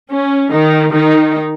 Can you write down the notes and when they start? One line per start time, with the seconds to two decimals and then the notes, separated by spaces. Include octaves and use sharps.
0.10 C#4
0.50 D#3 D#4
0.92 D#3 D#4